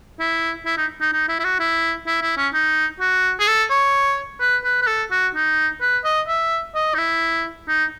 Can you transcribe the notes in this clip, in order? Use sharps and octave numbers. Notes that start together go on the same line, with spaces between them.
E4
E4
D#4
D#4
D#4
E4
E4
F#4
E4
E4
E4
C#4
D#4
F#4
G#4
A4
C#5
B4
B4
B4
A4
F#4
D#4
B4
D#5
E5
D#5
D#4
E4
D#4